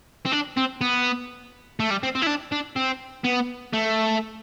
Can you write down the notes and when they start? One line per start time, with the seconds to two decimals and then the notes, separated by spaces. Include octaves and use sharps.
0.26 C4
0.32 D4
0.57 C4
0.81 B3
1.80 A3
1.91 G3
2.03 C4
2.15 C4
2.22 E4
2.27 D4
2.52 D4
2.76 C4
3.25 B3
3.73 A3